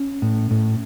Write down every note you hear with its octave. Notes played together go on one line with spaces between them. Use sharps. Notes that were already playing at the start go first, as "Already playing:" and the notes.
Already playing: C#4
A2
A2